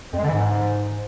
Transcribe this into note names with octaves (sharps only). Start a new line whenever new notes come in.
F2
G#3
D3
E3
G#2